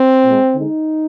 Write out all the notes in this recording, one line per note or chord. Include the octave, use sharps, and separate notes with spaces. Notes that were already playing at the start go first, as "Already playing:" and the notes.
Already playing: C4
A#2 G#3
D3 G#3 D#4